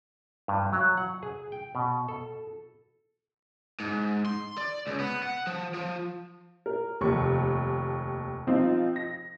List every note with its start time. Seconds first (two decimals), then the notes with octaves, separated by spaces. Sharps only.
0.48 G2
0.72 F#3
0.97 F#5
1.23 G#4
1.52 G5
1.75 B2
2.09 A4
3.80 G#2
4.26 C6
4.58 D5
4.87 C#2
5.00 B3
5.23 F#5
5.47 F3
5.74 F3
6.66 A#4
7.01 F1 D#2 C#6
8.47 F3 C4 D#4 F4
8.96 A#6